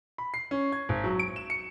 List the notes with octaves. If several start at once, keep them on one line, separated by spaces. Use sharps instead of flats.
B5
C7
C#4
G#6
G#1
F#3
D7
E7
C#7